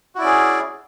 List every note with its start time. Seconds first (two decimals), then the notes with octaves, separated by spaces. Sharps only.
0.15 F#4
0.18 E4
0.21 D5
0.23 C#4
0.26 G#4